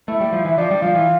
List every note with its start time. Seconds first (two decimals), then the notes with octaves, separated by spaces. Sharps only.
0.08 A3 E4
0.21 G3
0.33 F3
0.45 E3 E4
0.57 F3 D4
0.71 G3
0.82 F3 F4
0.95 E3